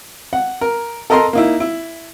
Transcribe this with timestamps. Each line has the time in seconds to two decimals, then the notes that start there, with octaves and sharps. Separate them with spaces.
0.33 F#5
0.61 A#4
1.10 A4 A#4 D#5 A#5 C6
1.33 A#3 D#4 E4
1.60 E4